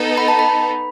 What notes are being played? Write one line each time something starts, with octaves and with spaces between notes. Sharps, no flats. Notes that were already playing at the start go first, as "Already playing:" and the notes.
Already playing: B3 D#4 A4
B5
A5
B5